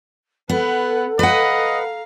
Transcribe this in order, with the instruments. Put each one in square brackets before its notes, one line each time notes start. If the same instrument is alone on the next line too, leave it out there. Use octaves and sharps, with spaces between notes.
[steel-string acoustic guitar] B3 [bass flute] A4 [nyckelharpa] B4 F#5
[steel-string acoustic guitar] B4 F#5 [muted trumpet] D#5 [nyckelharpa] F5 A#5